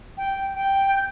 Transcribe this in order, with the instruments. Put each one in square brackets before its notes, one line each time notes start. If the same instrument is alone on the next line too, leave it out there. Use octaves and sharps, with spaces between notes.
[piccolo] G5
G5
G6